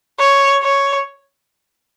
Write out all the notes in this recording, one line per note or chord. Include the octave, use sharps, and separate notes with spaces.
C#5
C#5